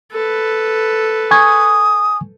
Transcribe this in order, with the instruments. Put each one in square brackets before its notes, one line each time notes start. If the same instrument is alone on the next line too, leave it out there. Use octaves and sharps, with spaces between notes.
[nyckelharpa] A4 B4
[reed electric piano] G#5 C#6 G#6 [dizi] D#6